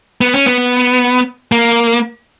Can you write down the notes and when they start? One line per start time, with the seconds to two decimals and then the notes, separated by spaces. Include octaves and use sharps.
0.21 B3
0.34 C#4
0.46 B3
1.52 A#3